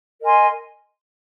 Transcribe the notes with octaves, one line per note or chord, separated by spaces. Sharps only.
A#4 D#5 G#5 C6